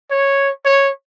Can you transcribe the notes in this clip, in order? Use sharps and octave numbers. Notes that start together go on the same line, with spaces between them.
C#5
C#5